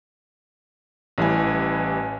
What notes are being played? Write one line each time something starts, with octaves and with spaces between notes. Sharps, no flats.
A1 E3 G3 G#5